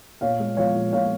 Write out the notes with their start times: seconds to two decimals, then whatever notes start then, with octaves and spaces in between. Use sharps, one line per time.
0.21 A#2 C#5 F5
0.40 G#3
0.57 F3 C#5 F5
0.75 A#2
0.92 A#2 C#5 F5